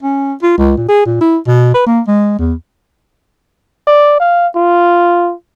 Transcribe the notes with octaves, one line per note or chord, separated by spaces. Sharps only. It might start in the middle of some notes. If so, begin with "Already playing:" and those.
C#4
F4
C#2
A#2
G#4
A#2
E4
B2
B4
A#3
G#3
E2
D5
F5
F4